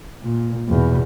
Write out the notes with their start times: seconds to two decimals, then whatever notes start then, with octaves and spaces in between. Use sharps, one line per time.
0.24 A#2
0.69 E2 B2